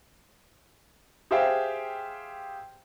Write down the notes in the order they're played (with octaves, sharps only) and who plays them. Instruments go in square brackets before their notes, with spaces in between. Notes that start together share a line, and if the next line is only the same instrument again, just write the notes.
[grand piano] G4 G#4 C5 E5 F5 G5